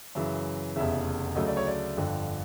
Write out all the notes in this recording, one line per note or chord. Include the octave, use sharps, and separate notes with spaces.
F#2 C#3 E3 E5
F1 E2 C#3 E5
D2 C#3 F#3 A3 D#5
D5
C#5
D5
G1 F2 D3